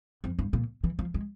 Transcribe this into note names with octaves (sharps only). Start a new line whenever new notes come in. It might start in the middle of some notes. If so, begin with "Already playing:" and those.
F2
G2
A#2
E3
F3
G#3